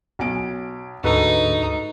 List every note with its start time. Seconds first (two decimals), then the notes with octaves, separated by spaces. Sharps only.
0.19 B1 G#5 D7
1.04 D2 G#2 D#4 F#4 A4 B4